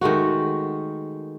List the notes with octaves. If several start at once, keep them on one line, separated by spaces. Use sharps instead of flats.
D#3 G#3 A3 F#4